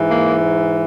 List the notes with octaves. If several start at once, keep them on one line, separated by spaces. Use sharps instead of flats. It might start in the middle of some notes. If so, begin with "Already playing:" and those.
Already playing: G#2 E3
A#3